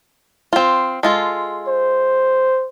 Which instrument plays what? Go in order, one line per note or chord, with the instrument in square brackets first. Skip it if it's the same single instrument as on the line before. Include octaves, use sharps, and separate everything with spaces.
[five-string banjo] C4 F4
G#3 F4 A4
[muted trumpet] C5